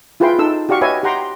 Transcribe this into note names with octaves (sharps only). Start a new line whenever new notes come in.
E4 F4 G#4 B4 G5 C6
D#4 A4 E6
F#4 G4 D5 F5 C#6
B4 C#5 D#5 E5 G#5
G4 F#5 G5 A#5 C6